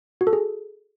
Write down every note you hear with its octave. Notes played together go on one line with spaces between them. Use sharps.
F#4
A4
G#4